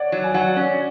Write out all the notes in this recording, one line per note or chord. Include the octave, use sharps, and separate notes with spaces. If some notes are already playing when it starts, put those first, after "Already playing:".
Already playing: C#5 D5 F#5
F#3
G#5
F#3 F#5
C#4